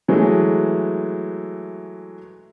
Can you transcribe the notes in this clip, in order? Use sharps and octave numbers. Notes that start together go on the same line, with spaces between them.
E3 F#3 G#3 A3